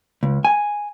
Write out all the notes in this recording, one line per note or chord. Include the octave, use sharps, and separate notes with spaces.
C#2
G#5